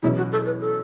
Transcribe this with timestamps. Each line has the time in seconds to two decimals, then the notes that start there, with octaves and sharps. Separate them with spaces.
0.03 E2 B2 F#3 C#4 E4
0.17 F#4
0.32 A4
0.46 B4
0.60 A4